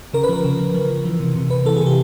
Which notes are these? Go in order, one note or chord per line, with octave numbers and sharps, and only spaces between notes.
C#3 A#4
B4
F3 A#4
C#3
F3
F3
F3
E3
C3
C3
C3 B4
E3 A4
C3 G#4
G4